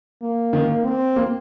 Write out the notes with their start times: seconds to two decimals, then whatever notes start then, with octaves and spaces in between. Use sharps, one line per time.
0.22 A#3
0.53 D#3
0.85 C4
1.16 A#3